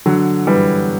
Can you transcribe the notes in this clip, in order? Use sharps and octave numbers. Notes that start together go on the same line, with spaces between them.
D3 F#3
E3 G3